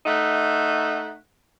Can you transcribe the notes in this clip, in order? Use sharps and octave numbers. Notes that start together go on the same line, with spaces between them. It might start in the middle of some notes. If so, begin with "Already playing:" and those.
A3 D#4 E5 F#5